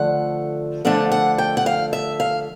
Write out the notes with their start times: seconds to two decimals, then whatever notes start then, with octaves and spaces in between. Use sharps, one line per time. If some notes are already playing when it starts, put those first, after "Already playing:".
Already playing: D3 F3 A3 D4 F#5
0.85 D3 F3 A3 D4 F#5
1.12 F#5
1.38 G5
1.57 F#5
1.66 F5
1.93 E5
2.20 F5